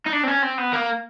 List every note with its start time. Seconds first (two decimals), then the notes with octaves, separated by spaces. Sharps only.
0.06 D#4
0.13 D4
0.24 C4
0.28 C#4
0.43 C4
0.58 B3
0.73 A#3